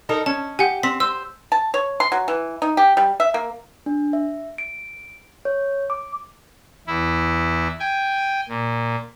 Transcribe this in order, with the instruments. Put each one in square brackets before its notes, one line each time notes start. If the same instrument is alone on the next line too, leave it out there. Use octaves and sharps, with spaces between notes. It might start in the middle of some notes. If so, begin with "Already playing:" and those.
[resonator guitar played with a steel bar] D#4 A4 A#4
[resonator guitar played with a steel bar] C#4 [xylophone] A5
[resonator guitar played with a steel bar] G4 [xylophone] F#5 G#5
[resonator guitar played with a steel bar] C4 [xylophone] B6
[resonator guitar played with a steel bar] C5 [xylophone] E6
[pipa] A5
C#5
C6
F#3
E3
D#4
G4
G3
E5
A#3
[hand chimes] D4
E5
D7
C#5
D6
[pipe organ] E2 E4
G5 G#5
A#2